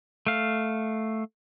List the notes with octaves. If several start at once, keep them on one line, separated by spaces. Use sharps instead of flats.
A3 F5